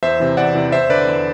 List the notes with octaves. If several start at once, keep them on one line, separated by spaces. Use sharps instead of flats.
E2 C5 E5
C3 E3
E2 D5 F#5
C3 E3
E2 C5 E5
D3 B4 D5
E2